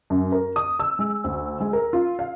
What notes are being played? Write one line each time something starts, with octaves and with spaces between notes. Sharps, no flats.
F#2
A#4
D#6
E6
G#3
D2
G#3
A#4
F4
F5